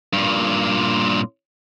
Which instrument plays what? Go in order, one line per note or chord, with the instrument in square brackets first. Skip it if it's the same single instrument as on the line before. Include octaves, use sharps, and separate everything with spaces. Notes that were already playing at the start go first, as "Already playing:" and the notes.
[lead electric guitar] G2 A#2